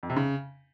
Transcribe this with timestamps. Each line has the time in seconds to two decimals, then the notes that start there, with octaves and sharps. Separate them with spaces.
0.03 F2
0.10 C3
0.16 C#3